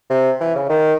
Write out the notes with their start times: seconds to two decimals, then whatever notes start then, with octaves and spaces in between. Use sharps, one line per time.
0.10 C3
0.41 E3
0.55 C#3
0.69 D#3